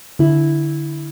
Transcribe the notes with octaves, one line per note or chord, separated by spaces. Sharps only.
D3 E4